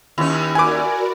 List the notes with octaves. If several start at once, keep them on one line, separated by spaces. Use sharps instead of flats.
D#2 C#4 E4 E6
F#4 A#4 B4 D5 E5 G#5 D6